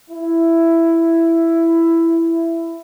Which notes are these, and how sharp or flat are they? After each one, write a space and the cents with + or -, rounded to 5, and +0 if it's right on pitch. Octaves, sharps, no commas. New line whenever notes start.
E4 +10